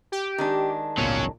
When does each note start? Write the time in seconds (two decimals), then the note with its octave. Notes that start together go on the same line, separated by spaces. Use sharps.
0.12 G4
0.38 D#3 G#3 D4
0.98 G#1 C#2 A#2 F#3 B3 C#4